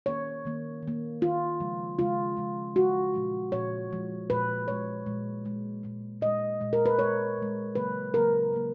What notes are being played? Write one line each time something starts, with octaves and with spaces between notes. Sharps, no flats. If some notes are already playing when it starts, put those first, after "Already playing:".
D#3 A#3 C#5
D#3 A#3
D#3
A#3
D#3 A#3 F4
C#3 F3 G#3
C#3 F3 G#3 F4
C#3 F3 G#3
C#3 F3 G#3 F#4
A#2 F3 G#3
A#2 F3 G#3 C#5
A#2 F3 G#3
A#2 F3 G#3 B4
A#2 G#3 C#5
A#2 G#3
A#2 G#3
A#2 G#3
A#2 G#3 D#5
A#2 G#3
A#4
B4
A#2 G#3 C#5
A#2 G#3
C#3 F#3 A#3 B4
C#3 F#3 A#3 A#4
C#3 F#3 A#3